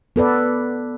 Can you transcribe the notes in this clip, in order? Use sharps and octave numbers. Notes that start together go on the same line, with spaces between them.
B3 A4 B4 D5